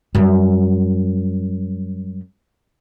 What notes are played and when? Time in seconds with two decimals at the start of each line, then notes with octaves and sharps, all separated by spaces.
0.15 F#2 G3